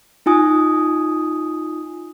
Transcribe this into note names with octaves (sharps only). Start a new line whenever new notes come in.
D#4 F4 G#5 D#6